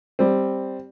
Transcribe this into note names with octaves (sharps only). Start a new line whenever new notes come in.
G3 C4